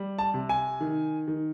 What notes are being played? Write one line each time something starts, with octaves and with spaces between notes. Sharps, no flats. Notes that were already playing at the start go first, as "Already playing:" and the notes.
Already playing: G3
A5
C3
G#5
D#3
D#3